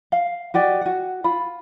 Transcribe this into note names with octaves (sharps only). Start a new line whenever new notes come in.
F5
F#4 G4 D5 D#5
F#4 F#5
F4 B5